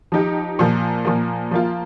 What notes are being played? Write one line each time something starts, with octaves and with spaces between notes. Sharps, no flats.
F3 D#4 G4
A#2 F3 A#3
A#2 F3 A#3
F3 A#3 F4